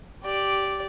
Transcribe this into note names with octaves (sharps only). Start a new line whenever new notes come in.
G4 D5